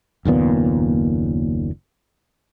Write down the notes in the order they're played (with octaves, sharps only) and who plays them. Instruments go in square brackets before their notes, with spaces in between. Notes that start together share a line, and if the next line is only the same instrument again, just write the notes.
[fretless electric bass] F#1 D#2 A#2 B3